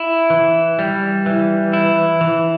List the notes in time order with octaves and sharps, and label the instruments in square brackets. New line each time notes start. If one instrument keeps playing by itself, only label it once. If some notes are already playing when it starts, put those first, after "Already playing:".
Already playing: [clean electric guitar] E4
E3
G3
E3
E4
E3